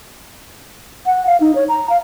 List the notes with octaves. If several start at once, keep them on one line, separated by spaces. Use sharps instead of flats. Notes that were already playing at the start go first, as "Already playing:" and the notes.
F#5
F5
D#4
C#5
A#5
F5